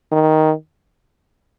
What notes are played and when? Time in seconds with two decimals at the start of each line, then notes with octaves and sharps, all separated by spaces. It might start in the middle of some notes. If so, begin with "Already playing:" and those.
0.12 D#3